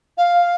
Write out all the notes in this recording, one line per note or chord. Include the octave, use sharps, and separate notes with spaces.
F5